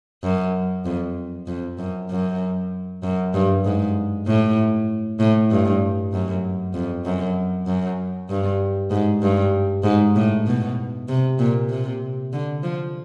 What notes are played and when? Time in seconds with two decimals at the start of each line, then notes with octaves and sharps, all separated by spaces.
0.23 F#2
0.85 F2
1.47 F2
1.78 F#2
2.10 F#2
3.03 F#2
3.34 G2
3.65 G#2
4.27 A2
5.20 A2
5.51 G2
6.13 F#2
6.74 F2
7.05 F#2
7.67 F#2
8.30 G2
8.91 G#2
9.22 G2
9.84 G#2
10.16 A2
10.47 B2
11.09 C3
11.39 A#2
11.70 C3
12.33 D3
12.63 F3